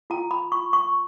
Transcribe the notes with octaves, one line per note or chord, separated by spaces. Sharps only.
F4 A#5
B5
F4 C#6
C#6